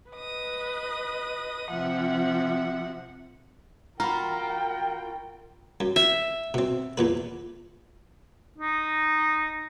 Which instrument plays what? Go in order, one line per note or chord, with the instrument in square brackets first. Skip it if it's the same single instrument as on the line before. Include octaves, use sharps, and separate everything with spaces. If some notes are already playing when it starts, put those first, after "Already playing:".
[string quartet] B4 D#5 D#6
C3 F3 E5 F#5
[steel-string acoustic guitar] F4 F#4 [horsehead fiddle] A#4 G5 [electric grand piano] A#5 [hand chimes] B5 F6
[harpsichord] F#2
[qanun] E5
[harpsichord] B2 C4
E2 A#2 B4
[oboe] D#4